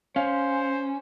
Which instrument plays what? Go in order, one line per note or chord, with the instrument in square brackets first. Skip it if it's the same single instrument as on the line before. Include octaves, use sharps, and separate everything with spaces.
[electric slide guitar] C#4 [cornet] C5 [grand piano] F5